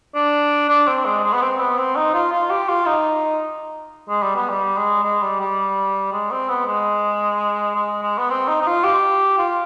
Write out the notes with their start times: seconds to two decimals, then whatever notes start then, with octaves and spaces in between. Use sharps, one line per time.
0.15 D4
0.69 D4
0.87 C4
1.05 G#3
1.24 G#3
1.33 B3
1.42 C4
1.60 B3
1.78 C4
1.96 D#4
2.14 F4
2.32 F4
2.50 G4
2.69 F4
2.86 D#4
4.09 G#3
4.23 G3
4.36 B3
4.49 G3
4.77 G#3
5.04 G#3
5.22 G3
5.40 G3
6.13 G#3
6.31 C4
6.49 B3
6.67 G#3
7.75 G#3
8.03 G#3
8.18 B3
8.30 C4
8.48 D#4
8.61 D#4
8.66 F4
8.84 G4
9.38 F4